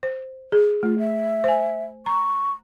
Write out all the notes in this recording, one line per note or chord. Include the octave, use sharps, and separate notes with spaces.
C5
G#4
A3 F4
E5
C5 G#5
A#5 C#6